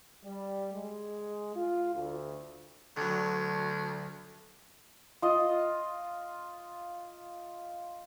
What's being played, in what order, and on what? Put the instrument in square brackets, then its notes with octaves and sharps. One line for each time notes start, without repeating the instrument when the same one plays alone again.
[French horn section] G3
G#3
F4
D2
[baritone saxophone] D2 [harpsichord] D3 F#3
[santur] F4 D#5